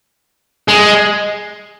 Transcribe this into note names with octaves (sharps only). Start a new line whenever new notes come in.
G#3